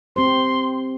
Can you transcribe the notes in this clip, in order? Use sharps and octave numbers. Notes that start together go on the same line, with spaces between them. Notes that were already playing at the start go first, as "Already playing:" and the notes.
C4 G4 C5 C6